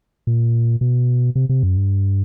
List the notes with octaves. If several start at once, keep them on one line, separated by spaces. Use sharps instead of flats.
A#2
B2
C3
C3
F#2
G2